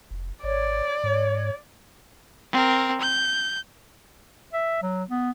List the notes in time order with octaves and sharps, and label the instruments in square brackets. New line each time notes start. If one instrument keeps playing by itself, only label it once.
[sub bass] F1
[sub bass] G#1 [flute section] C#5 [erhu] D5
[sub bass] G#2 [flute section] C#5
[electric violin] C4 A#4
G6
[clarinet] E5
F#3
B3